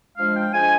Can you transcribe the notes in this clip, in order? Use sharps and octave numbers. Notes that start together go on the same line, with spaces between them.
F3 G#3 D4 F5
G5
F3 G#3 D4 G#5